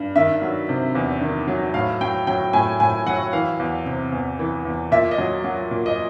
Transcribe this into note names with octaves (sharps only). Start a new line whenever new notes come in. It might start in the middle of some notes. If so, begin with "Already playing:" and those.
Already playing: G2
D#3 E5
F#3
C3
E2
D#3
F#3
A2 F5
F#3 G5
F#3 G5
A2 G#5
A2 G#5
F#3 F#5
E3 F5
E2
C3
E2
E3
E2
A#2 E5
D#5
F#3
F#3
A#2
D#5